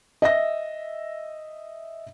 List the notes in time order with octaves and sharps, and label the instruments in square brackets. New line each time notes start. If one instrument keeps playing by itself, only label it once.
[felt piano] D#5 E5 A#6